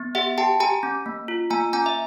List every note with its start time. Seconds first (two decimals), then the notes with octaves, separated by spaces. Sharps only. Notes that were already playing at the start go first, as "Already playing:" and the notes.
Already playing: B3
0.15 G4 E5 F#5
0.38 G4 G5 A5
0.60 G4 G#5 A#5
0.83 C#4
1.06 A#3
1.28 F4
1.50 A#3 G#5 A#5
1.73 C#4 G#5 A#5
1.86 E5